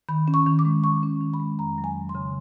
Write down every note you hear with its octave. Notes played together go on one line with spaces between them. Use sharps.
D#3 B5
C#4
C#6
D#3
D6
G#3
D#3 C#6
C#4
D#3
B5
G#3
F2 A#5
F#3
G#5
F2
C6
C#3